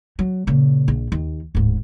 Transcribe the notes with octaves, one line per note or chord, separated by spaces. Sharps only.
F#3
A#2 C#3
A#1
D#2
D1 G#2